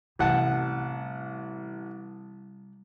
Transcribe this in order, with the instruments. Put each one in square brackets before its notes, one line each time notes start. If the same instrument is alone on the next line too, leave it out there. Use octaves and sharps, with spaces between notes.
[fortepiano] A1 F#5 A5 [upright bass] C3 G3